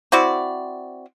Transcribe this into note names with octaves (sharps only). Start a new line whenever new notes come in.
C4 E4 F#4 D5